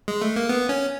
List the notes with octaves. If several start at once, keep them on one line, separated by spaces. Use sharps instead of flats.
G#3
A3
A#3
B3
C#4